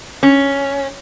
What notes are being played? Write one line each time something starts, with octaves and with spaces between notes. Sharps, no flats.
C#4